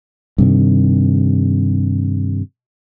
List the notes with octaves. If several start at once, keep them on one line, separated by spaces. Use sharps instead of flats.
G2 C3 D#3